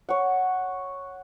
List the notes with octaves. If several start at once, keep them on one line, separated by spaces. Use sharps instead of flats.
C#5 F#5